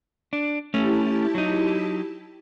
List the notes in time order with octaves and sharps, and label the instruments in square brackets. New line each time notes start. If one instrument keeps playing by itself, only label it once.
[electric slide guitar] D4
[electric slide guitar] A3 C#4 [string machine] E4 G4 A5
[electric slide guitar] F#3 D#4